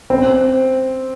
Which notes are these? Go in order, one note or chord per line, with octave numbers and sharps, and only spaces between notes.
C4